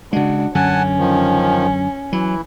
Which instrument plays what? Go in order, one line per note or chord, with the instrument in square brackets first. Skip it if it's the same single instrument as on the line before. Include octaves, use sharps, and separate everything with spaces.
[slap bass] C#3 G#3 [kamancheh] D4 F#4
[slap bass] F#2 D3 [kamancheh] C#4 [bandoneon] F#5 G#5 A5
[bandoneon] D#3 F3
[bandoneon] E3 E4 [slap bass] F#3